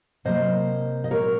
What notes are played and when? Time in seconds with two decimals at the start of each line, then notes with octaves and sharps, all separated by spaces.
0.25 C3 F#3 A#3 C5 D#5
1.04 D#5
1.11 A#2 G#3 C4 A#4 C#5